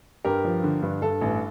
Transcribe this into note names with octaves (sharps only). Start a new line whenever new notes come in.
G2 G4 A#4
F3
D3
G2
G2 A4
A1